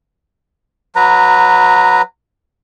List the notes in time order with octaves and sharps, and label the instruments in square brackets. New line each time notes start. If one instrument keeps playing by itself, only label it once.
[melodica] F#3 B4 A#5